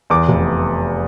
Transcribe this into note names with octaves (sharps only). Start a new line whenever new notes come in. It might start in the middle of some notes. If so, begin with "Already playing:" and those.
E2 D6
F1